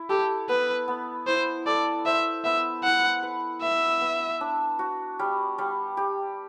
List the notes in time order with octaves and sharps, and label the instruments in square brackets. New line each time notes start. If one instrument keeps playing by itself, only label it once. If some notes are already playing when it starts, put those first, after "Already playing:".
Already playing: [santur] E4
[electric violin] G4 [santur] A4
[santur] B3 [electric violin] B4
[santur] B3
[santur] E4 [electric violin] C5
[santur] A4 [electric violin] D5
[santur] C5 [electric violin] E5
[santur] B3 [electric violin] E5
[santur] E4 [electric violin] F#5
[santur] B4
[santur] B3 [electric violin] E5
[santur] B3
D4
F#4
G3
G3
G4